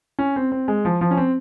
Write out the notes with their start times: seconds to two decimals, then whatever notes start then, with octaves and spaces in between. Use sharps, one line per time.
0.19 C#4
0.36 C4
0.52 C4
0.68 G#3
0.85 F3
1.01 F3
1.11 C#4
1.17 C4